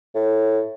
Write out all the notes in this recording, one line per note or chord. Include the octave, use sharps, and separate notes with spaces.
A2